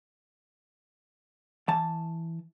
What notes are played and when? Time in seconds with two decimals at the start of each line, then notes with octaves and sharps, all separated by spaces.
1.68 E3 A5